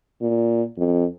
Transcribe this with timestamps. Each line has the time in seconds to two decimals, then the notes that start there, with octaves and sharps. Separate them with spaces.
0.21 A#2
0.78 F2